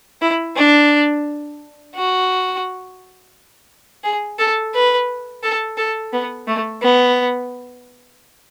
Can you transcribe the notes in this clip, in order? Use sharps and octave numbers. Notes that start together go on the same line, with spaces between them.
E4
D4
F#4
G#4
A4
B4
A4
A4
B3
A3
B3